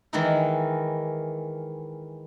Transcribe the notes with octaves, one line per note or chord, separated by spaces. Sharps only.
D#3 E3 G#3 A#3 D#4 E4